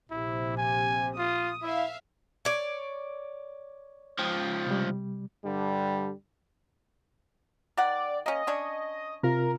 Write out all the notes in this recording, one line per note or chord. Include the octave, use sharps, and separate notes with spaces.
A#1 C3 E4
G#5
F4 D#6
E4 E5 F5
C#5 D5
C#2 F3 G5 D#6
C3 G3
G2 D3 G3
D#3 D5 F#5
A#3 C#4 D#5
C#4 D4 C#5
C3 F4 A#4